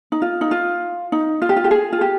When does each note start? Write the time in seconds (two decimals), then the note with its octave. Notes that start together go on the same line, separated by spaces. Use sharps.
0.12 D#4
0.22 F4
0.41 D#4
0.51 F4
1.12 D#4
1.42 F4
1.49 G4
1.56 F4
1.64 G4
1.71 G#4
1.93 F4
2.01 G4